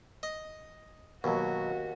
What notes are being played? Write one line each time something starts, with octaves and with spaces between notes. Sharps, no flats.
D#5
D#2 B2 F#3 F#4